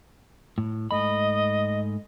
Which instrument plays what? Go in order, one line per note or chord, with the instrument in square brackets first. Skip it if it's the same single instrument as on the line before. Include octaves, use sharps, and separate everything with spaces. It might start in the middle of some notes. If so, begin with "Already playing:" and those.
[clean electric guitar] A2
[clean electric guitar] G#2 A3 B5 [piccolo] D#5